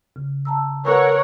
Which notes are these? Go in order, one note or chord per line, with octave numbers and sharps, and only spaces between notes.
C#3
A5 A#5 E6
A#4 B4 C#5 F#5 E6 F#6